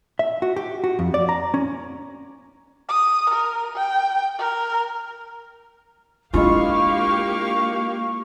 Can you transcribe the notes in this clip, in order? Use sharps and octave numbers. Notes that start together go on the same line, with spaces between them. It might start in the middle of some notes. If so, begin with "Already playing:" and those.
E5
F#4
G4
F#4
F2
D5
A#5
C#4
D#6
A#4
G5
A#4
G#3 A#3 D4 E4 F4 G4 F5 C#6